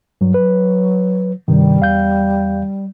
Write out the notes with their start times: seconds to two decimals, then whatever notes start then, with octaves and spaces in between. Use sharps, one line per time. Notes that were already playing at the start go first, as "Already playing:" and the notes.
0.21 G2 F#3
0.34 F#3 B4
1.48 G2 C3 D#3 G3
1.80 E2 F5 G6